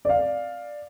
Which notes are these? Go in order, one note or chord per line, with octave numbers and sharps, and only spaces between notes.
D5 F5